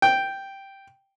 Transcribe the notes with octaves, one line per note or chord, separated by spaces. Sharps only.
G5